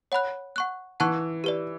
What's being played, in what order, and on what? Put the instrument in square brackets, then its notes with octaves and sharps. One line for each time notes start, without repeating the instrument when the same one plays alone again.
[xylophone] C#5 F#5 B5 F#6
F#5 C#6 F#6
[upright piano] E3 [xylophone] F#5 A5 C#6 F#6
[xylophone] G4 B4 D5